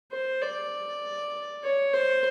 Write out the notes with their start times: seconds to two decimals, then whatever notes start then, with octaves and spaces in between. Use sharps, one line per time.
0.12 C5
0.42 D5
1.64 C#5
1.93 C5